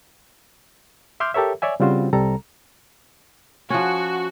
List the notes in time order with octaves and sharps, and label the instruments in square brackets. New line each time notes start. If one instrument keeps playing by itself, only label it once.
[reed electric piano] E5 C6 D6 F6 G6
G4 A4 A#4 C#5 E5
C#5 D5 E5 G#5
C#3 G3 C4 F4 F#4 C5
C2 C3 G3 A4 A#5
[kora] F3 C#4 [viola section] F#4